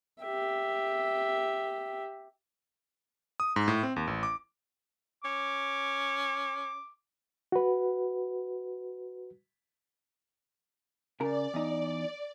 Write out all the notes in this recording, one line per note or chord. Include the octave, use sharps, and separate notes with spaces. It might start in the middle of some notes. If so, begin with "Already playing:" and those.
G4 E5
D#6
G#2
A2
C4
D#2
A1
D6
C#4 D6
F#4 B4
C#3 A#4 D5
E2 D#4